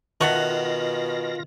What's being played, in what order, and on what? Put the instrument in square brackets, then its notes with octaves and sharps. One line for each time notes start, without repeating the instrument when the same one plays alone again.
[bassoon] B2 [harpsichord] D#3 [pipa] A3 F#5 C#6 [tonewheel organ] F4 A#6